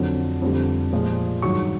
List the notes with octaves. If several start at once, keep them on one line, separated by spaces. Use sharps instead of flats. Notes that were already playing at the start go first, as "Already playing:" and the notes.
Already playing: F2 D3 F#3
F2 D3 G3
A#2 F3 G#3
G2 D#3 F#3 C#6